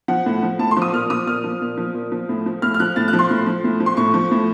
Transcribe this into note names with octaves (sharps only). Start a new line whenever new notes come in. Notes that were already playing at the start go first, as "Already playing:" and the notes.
F3 F#5
A2
F3
A2 A5
C6
F3
D#6
A#2 F6
F3 D#6
A#2 F6
F3
A#2
F3
A#2
F3
A2
F3
A2 F6
F6
F3 F#6
A2 A6
F#6
F3
C6
A2
F3
A2
F3
C6
A2 C#6
F3
A2